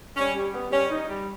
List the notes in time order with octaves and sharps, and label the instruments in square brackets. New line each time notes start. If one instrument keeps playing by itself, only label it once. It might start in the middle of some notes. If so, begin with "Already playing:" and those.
[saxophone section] G3 [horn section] C#4
[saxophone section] G3
B3
[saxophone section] G3 [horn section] C#4
[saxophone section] D#4
G3